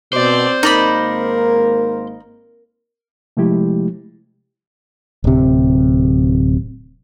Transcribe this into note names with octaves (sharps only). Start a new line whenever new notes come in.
B2 C4 C5 D5
G#1 G#2 A#3 D#4 A#4 D5 B5
C3 F3 G#3 A3 E4 G4
D1 C3